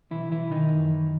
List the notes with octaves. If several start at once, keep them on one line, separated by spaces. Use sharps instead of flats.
B1 E3 E4
B1 E3 E4
D#3 E3 D#4
F#2
E3